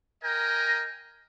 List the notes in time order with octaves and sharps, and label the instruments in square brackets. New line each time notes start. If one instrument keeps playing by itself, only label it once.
[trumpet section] A#4 D#5 G5 G#5 A#5